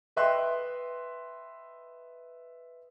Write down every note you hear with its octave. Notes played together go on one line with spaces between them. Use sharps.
B4 D#5 E5 G5 C6 F#6